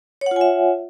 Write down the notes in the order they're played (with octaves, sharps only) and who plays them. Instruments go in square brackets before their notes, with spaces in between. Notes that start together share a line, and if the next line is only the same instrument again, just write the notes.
[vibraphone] C#5
F#5
F4
G#5
E5